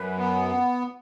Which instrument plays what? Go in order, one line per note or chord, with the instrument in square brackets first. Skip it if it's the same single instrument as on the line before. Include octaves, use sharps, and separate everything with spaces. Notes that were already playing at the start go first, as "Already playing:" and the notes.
Already playing: [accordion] F#2 [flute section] B4
[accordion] B3